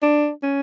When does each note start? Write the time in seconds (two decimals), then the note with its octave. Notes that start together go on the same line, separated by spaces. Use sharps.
0.03 D4
0.43 C#4